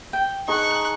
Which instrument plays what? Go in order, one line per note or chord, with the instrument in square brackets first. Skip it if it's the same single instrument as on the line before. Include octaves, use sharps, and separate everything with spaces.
[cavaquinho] G5
[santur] D#4 G#4 A5 [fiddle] C#6 F#6